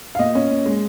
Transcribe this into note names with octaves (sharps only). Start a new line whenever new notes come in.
F5
A#2 D#5
C#4
A#2
G#3